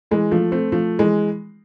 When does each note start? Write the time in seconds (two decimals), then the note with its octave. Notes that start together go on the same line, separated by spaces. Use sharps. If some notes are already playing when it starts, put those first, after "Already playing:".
0.11 E3 G#3
0.31 F3 A3
0.52 A3 C4
0.72 F3 A3
0.99 E3 G#3